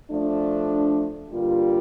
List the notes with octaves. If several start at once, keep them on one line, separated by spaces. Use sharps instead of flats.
F3 A3 D4
G2 D3 G3 A#3 F4